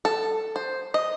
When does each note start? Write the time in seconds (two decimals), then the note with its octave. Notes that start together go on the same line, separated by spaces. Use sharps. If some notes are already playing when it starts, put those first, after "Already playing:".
0.05 A4
0.56 C5
0.94 D#5